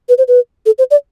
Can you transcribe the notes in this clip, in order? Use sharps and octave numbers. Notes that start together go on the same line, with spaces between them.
B4
C5
B4
A4
C5
D5